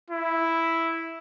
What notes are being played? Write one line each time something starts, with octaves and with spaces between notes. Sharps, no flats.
E4